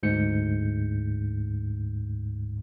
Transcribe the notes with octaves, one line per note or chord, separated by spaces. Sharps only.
D2 G#2 G6 C#7